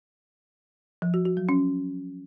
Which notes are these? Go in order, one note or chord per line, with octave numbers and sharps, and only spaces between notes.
F3
F#4
F#4
F#3
C#4